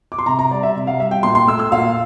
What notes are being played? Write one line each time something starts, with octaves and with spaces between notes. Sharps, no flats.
D6
C6
C3 A#5
A#5
G3 D5
E5
C3
F5
G3 E5
G5
A#2 C6
C6
A3 E6
E6
A#2 F5